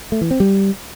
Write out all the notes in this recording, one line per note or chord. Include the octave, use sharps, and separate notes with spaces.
A3
E3
C4
G3